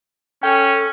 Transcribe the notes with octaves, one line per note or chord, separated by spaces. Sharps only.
C#4 A4 G5